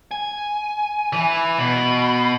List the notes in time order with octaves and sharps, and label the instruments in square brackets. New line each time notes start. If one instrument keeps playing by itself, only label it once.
[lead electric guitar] G#5
[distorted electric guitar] E3
[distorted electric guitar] B2 [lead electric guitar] B5